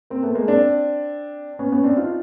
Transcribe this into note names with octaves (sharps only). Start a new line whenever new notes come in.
A#3 C4
A3 B3
G#3 A#3
C4 D4
B3 C#4
B3 C#4
C4 D4
D#4 F4